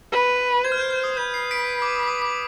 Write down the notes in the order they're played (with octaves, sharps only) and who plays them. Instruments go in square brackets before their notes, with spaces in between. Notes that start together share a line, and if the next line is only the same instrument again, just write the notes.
[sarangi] B4
[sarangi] C5 [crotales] G#6
[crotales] F6
G6
F6
D#6
[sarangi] B4 [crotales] G6
[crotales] C7
B6 D7
D6
D#6
D6
D#6
D6